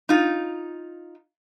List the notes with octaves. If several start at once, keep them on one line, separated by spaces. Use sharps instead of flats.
D#4 F4